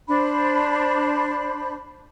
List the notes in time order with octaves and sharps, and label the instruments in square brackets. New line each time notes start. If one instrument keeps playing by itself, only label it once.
[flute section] D4 C5 B5